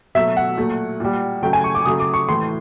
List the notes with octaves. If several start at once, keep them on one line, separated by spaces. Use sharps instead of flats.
B2 F#3 A3 E5
F#5
A#2 F#3 A3
A#2 G3
C#3 F#3 A3 G5
G#5
C#6
D6
C#3 F#3 A3 D#6
D6
C#6
A2 E3 A3 C6